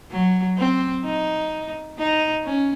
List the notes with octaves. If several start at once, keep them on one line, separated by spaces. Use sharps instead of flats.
F#3
C4
D#4
D#4
C#4